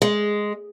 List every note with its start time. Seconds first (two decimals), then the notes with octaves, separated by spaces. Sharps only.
0.02 G#3